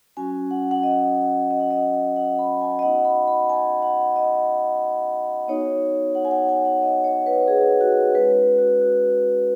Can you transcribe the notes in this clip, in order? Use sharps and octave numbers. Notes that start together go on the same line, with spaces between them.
F#3 C#4 F#4 G#5
F#5
F#5
D#5
D#5
F#5
D#5
F#5
B5
G#5
D#5
B3 D#4 F#4 F#5
B5
B5
G#5
F#5
D#5
B3 D#4 F#4 C#5
F#5
G#5
F#5
G#5
F#5
D#5
C#5
B4
G#4
F#4
G#3 C#4 F#4 B4
F#4
F#4